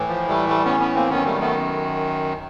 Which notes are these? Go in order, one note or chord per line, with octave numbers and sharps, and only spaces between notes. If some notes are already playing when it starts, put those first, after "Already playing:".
Already playing: A2 E3
F3
G3 A3
G3 A3
B3 C#4
B3 C#4
A#3 C4
F#2 D#3 B3 C#4
G3 A3
A3 B3